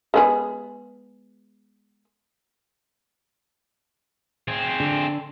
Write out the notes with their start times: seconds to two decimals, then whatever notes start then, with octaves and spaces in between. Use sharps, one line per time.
0.14 G#3 B3 G#4
4.48 C4 G#4
4.80 D3